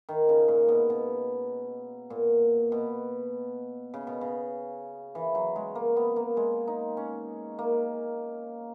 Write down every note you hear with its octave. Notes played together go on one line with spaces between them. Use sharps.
D#3
C#3
A#2
B2
B2
A#2
B2
C#3
B2
C#3
E3
F#3
G#3
A#3
B3
A#3
G#3
D#4
C#4
A#3